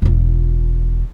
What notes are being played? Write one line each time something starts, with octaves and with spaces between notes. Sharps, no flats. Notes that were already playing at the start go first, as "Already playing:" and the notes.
E1 F4